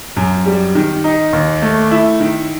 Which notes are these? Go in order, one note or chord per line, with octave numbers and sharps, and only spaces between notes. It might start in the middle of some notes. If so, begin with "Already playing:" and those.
F#2
G3
D#3
D#4
D#2
A3
E4
D#3